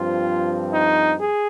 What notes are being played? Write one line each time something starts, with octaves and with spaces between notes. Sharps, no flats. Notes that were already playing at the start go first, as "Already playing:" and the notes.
Already playing: G2 F3 C4 F4
D#4
G#4